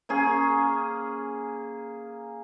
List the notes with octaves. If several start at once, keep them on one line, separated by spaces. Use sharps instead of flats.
A#3 C#4 G#4